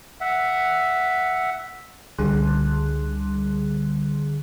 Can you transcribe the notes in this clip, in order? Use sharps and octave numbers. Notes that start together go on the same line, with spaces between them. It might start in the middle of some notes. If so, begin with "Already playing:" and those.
E5 F#5
C#2 D3 G3 G#4 C6 F#6